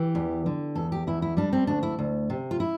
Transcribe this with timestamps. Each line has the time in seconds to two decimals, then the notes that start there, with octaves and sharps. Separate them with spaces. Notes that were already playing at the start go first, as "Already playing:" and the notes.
Already playing: E3 G4
0.15 E2
0.46 D3
0.75 E2 A4
0.92 G4
1.07 E2 E4
1.22 E4
1.37 G3 D4
1.53 C4
1.67 D2 D4
1.83 E4
1.99 D2
2.30 C3
2.51 F4
2.60 E4